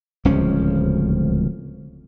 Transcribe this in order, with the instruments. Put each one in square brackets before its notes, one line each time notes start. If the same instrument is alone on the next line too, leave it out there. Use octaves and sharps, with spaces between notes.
[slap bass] D1 C#2 F3 C#4